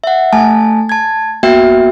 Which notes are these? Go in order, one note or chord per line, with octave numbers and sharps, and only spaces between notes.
E5 F#5
A3 G#5 A5
A5 G#6
A#3 B3 F#4 E5 G5